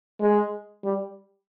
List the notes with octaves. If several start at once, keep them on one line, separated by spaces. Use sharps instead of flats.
G#3
G3